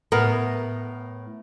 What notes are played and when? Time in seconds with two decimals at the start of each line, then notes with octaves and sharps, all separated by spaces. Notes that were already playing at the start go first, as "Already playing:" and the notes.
0.12 A2 B3 A#4